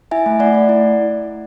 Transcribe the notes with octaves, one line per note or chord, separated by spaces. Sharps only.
E4 E5 G#5
A3
A3 D5 F#5
A3
E4